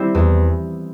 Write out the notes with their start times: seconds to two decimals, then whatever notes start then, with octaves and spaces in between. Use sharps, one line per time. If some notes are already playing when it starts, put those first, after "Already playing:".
Already playing: G3 C4 E4
0.15 E2